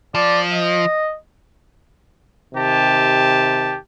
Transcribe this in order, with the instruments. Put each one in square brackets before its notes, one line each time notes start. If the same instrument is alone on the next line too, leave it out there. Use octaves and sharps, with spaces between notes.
[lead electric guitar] F3 [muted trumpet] D5
[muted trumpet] D#5
[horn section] C3 D#3 G4 A5